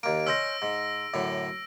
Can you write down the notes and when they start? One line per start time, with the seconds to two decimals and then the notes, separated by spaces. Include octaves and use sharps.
0.03 D#2 A#3 D7
0.27 C#4 C5 D#5 E6 A#6
0.62 G#2
1.14 F#2 A2 D3